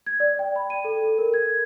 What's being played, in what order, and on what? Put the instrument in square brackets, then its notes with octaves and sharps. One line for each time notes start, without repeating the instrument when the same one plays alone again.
[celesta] G#6
D5
G5
B5
D#7
A4
A4
A#4
G#6